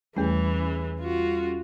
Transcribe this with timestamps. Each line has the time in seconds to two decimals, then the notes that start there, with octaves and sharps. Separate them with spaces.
0.17 E2 E3 G3 A3 C#4 G#4
1.00 F4 F#4